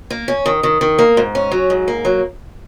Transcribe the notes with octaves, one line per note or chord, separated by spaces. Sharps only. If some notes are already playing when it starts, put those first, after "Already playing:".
A#3
C#4
D#3
D#3
D#3
A#3
G#2
C#4
F#3
G#2
A#3
F#3